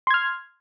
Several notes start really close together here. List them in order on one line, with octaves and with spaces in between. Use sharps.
C6 G#6 F6